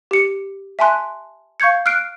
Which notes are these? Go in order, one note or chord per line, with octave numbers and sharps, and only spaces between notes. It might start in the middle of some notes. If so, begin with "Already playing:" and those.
G4 C#7
E5 G#5 A5 C6 F#6
F5 C#6 G6 G#6 C#7
F6 F#6 C7 D7